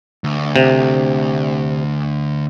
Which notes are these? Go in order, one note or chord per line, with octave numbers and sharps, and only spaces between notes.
D2
C3